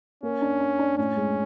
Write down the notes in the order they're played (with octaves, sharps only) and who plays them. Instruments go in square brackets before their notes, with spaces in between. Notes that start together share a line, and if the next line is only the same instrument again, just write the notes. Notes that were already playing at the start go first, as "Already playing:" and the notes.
[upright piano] A#3 [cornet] C#4
[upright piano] D4
D4
D4
[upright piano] A2 [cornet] C#4
[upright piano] G#3